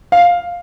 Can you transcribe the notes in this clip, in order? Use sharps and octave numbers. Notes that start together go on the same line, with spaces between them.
F5